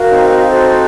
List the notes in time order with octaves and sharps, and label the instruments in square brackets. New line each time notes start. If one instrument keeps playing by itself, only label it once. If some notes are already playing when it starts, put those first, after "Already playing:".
Already playing: [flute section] F#4 A#4 F5
[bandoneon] C4 D#4
[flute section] F#4 A4 C5 F5